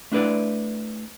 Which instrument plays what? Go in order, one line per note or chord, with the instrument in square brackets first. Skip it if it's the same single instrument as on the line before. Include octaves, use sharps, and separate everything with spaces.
[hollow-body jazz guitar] A3 D4 E4 B4 D5